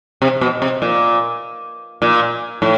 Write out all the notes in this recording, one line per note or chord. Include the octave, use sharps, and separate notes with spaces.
C3
B2
C3
A#2
A#2
A2